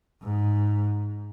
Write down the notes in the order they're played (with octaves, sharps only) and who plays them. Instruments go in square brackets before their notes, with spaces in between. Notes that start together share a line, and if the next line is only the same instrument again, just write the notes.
[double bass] G#2